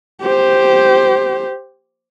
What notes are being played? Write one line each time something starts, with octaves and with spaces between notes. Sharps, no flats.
G4 C5